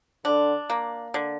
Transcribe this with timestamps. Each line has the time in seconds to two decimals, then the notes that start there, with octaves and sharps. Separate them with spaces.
0.25 D3 D4
0.70 A#3
1.14 D3